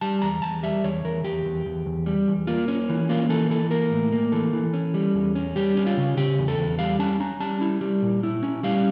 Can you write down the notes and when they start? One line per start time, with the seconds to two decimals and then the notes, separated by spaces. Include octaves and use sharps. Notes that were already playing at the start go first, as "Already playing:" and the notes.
0.01 G3 A5
0.22 E2 A#5
0.42 E2 A5
0.63 G3 E5
0.84 E2 C#5
1.04 E2 A#4
1.24 E2 G4
1.45 E2
1.66 E2
1.86 E2
2.06 G3
2.28 E2
2.47 A#3 F4
2.68 C#4
2.89 E3
3.09 A#3 F4
3.29 E3 A4
3.50 E3 A4
3.71 A#3 A#4
3.92 A2
4.12 A#3
4.32 E3 A4
4.53 E3
4.73 C#4
4.94 G3
5.14 E2
5.35 C#4
5.56 G3 G4
5.77 C#4
5.86 F4
5.97 C#3
6.17 C#3 G4
6.39 E2
6.48 A4
6.58 E2
6.79 G3 F5
6.99 C#4 A5
7.20 C#4 A#5
7.40 G3 A5
7.61 E4
7.81 G3
8.02 A#2
8.23 E4
8.43 C#4
8.63 G3 F5